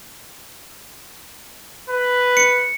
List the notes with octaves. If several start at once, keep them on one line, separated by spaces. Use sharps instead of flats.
B4
C#7